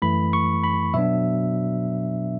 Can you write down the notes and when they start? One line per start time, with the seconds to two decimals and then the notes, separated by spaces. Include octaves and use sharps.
0.02 F#2 E3 A3 B5
0.33 C#6
0.64 B5
0.94 B2 F#3 B3 D4 E5